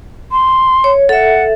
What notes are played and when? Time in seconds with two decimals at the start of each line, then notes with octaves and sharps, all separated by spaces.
0.32 C6
0.84 C#5
1.09 A4 E5 F#5